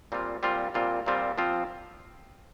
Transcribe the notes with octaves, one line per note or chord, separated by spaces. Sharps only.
A#2 G3 C4 F4
A#2 G3 C4 F4
A#2 G3 C4 F4
A#2 G3 C4 F4
F3 C4 F4